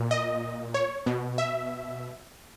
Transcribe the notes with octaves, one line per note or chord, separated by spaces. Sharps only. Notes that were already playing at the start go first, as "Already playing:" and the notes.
Already playing: A#2
D#5
C#5
B2
E5